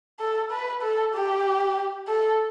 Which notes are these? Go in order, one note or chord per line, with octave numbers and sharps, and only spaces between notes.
A4
B4
A4
G4
A4